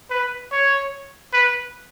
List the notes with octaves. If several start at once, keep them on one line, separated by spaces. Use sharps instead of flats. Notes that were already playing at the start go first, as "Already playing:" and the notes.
B4
C#5
B4